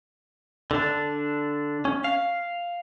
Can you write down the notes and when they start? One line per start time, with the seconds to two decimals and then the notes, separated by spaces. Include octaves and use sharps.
0.71 D3 D4
1.85 C#4
2.04 F5